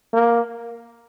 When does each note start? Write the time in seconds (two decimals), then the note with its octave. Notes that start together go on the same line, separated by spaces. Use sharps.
0.13 A#3